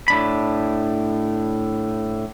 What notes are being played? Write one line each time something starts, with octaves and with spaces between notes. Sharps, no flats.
A2 D4 B5